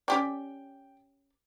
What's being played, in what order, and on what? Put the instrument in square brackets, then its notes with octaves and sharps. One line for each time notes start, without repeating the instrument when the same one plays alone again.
[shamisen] C#4 G4 D5 [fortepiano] G5